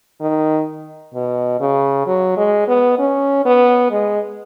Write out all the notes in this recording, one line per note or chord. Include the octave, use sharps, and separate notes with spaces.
D#3
B2
C#3
F#3
G#3
B3
C#4
B3
G#3